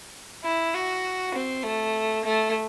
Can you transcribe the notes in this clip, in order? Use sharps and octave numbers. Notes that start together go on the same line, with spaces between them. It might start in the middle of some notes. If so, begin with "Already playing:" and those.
E4
F#4
C4
A3
A3